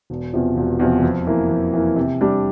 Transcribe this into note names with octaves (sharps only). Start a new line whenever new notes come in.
E1
E2 C3 F3
E1
E2 C3 F3
F2
E3 A#3
F2
E3 A#3
C3
G3 D4